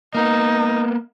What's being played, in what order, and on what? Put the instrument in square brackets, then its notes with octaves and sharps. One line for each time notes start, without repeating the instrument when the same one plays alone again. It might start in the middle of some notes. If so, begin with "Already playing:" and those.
[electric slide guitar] A#3 B3 [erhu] D#4